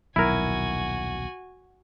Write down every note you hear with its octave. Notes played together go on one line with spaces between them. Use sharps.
D#1 B1 F#3 E4 F#4 A#4 G#5